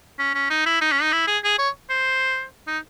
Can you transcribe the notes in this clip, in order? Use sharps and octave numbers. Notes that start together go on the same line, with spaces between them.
C#4
C#4
D#4
E4
D#4
C#4
D#4
E4
G#4
G#4
C#5
C5
D#4